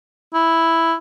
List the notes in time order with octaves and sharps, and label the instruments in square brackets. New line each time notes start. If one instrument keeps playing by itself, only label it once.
[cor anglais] E4